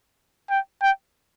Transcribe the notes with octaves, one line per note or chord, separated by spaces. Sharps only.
G5
G5